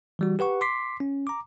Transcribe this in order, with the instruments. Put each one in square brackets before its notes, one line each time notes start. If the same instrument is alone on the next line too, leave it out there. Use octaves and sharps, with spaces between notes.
[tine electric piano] E3 G3 F#4
G4 B4 F#5 C#6
C6 D6 B6 C7
C#4
A#5 D6